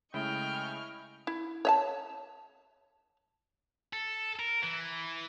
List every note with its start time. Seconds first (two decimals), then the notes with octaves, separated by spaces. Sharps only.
0.14 C#3 G#3 A3 E4 D#5 G5 C#6 F6
1.27 E4
1.65 C#5 E5 A5
3.93 A4
4.39 A#4
4.63 E3